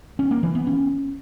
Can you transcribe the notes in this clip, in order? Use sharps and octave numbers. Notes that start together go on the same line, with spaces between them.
C#4
A#3
E3
B3
C#4